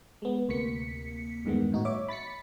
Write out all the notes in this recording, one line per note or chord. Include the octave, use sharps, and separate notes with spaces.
G#3 B3
D2 C3 A#3 B6 C#7
E2 G2 D#3 G#3 B3
A2 D#4 F#4
C#5 E5 D6
B5 A6 B6 C#7